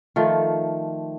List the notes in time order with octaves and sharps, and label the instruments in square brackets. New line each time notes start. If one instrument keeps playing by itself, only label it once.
[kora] D#3 F3 A3